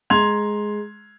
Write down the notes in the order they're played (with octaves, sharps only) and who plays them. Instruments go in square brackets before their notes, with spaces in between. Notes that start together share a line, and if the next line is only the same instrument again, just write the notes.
[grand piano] G#3 A#5 C6 G#6 F7